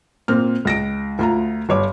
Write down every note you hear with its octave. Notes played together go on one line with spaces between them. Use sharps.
A#2 A#3 C4 F6
C#2 A#6 D7
D2 F4 A#5
G1 C#5 D6